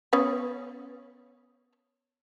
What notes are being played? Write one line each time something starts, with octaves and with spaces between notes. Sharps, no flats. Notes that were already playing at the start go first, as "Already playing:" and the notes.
B3 C#4 B4